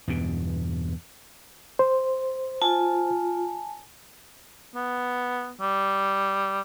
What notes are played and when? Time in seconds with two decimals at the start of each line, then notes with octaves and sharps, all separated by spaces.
0.08 E2 G2 B2
1.79 C5
2.62 F4 G#5 A5
4.75 B3
5.61 G3